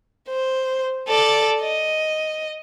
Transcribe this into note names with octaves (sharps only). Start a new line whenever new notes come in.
C5
A4 D5
D#5